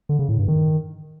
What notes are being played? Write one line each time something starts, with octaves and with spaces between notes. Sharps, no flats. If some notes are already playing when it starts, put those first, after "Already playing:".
D3
C#3
A2
G2
D#3